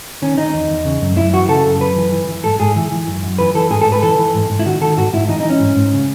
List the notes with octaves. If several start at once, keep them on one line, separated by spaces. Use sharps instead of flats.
D#3 C#4
D#3 D#4
E2
E2
C#3
F#2
F#2 E4
E3 F#4
C#3 A4
F#2
F#2 B4
E3
E3
E3
G#2 A4
G#2 G#4
E3
E3
F#2
F#2
E3 B4
E3 A4
G#2 G#4
A4
G#2
B4
E3 A4
E3
G#2
G#2
E4
D#3 F#4
D#3 A4
G#2 F#4
G#2 E4
E3 D#4
D#4
E3
C#4
G#2
G#2
C#3